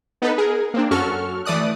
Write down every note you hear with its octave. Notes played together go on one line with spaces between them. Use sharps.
B3 D#4 A4 B4
G#4 A#4
A#3 C4 D4
F#2 C#4 F#4 A4 C#6 F6
E3 A3 D5 D#6 F#6